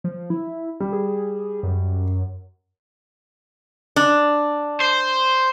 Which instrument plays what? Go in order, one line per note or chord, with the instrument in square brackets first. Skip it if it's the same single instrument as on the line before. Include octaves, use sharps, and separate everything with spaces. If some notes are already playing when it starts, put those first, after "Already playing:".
[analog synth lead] F3
E4
[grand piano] G3
[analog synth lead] G#4
F#2
[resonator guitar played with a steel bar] D4
[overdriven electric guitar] C5